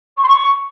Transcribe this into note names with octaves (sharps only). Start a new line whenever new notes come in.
C#6
C6
C#6